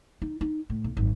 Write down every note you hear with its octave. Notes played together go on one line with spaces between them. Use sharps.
D#4
D#4
A2
B1
G#1 F#2